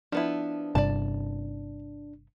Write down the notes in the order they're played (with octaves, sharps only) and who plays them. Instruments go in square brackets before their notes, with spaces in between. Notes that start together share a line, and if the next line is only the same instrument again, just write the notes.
[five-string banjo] F3 B3 E4 [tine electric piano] D4
[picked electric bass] G1 G2 C3 [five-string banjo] D5 A5